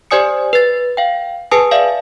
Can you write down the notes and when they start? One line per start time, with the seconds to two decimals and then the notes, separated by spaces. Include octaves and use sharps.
0.11 G4 C5 D5 G#5 D#6 C#7
0.53 B4 A6
0.97 F5 G5
1.51 G#4 B4 G#5 A5 D#6
1.71 D5 E5 F5